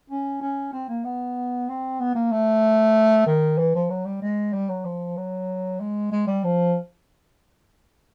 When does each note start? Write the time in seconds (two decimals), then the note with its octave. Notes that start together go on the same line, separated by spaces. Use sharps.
0.10 C#4
0.42 C#4
0.73 C4
0.89 A#3
1.04 B3
1.69 C4
2.00 B3
2.15 A#3
2.32 A3
3.26 D#3
3.58 E3
3.75 F3
3.90 F#3
4.06 G3
4.22 G#3
4.53 G3
4.69 F#3
4.85 F3
5.17 F#3
5.80 G#3
6.12 G#3
6.27 G3
6.44 F3